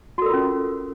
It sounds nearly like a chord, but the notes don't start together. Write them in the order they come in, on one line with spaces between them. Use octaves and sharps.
F#4 A4 A#4 F4 C#4